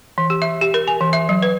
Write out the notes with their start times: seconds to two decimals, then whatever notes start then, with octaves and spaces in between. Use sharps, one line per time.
0.18 E3
0.30 G4
0.42 E5
0.61 G4
0.74 A#4
0.88 G#5
1.01 E3
1.13 E5
1.29 F#3
1.42 B4